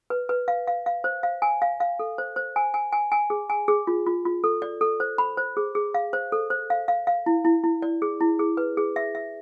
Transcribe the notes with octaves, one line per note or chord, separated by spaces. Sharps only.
B4
B4
F5
F5
F5
C5
F5
G#5
F5
F5
A4
C5
C5
G#5
G#5
G#5
G#5
G#4
G#5
G#4
F4
F4
F4
A4
D5
A4
C5
B5
C5
G#4
G#4
F5
C5
A4
C5
F5
F5
F5
E4
E4
E4
D5
G#4
E4
G#4
B4
G#4
E5
E5